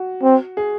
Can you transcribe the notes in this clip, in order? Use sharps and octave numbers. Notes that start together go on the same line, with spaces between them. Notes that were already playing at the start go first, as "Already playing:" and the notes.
Already playing: F#4
C4
G#4